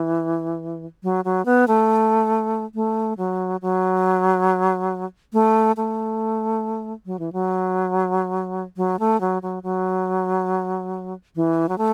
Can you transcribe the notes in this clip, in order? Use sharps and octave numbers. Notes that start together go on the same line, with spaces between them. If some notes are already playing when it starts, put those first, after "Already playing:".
Already playing: E3
F#3
F#3
B3
A3
A3
F#3
F#3
A3
A3
F#3
E3
F#3
F#3
A3
F#3
F#3
F#3
E3
F#3
A3